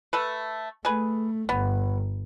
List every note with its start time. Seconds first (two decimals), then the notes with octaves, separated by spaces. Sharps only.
0.13 A3 A4 B4
0.85 A3 G#4 B4
1.49 G1 B3